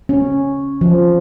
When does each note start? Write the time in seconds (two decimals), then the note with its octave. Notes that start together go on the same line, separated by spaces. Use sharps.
0.09 C#4
0.81 F3